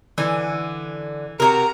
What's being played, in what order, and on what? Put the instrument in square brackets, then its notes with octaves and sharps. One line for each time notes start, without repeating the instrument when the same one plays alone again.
[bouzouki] D3 G#5 [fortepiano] E3
[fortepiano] C3 [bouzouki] F#4 G#4 A#4 [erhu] A#5